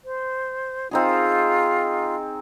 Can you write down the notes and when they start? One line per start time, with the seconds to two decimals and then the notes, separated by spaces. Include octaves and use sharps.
0.04 C5
0.91 C4 D#4 F4 G#4